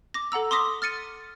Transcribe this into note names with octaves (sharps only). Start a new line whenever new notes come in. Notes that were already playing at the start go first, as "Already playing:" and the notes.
D6 A#6
A4 F#5 A#5 E6
C6 D6 D#6 A#6 B6
F6 A6 C#7 D#7